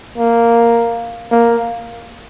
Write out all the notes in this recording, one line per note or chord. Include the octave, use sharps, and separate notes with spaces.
A#3
A#3